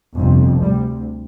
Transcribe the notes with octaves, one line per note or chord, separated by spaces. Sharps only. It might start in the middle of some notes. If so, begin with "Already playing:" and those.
G1 F2 C3
D2 C3 G3